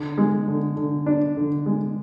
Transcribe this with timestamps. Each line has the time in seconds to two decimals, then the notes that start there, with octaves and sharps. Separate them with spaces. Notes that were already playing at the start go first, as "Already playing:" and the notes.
Already playing: D3
0.18 G#3
0.48 D3
0.76 D3
1.06 D4
1.37 D3
1.66 G#3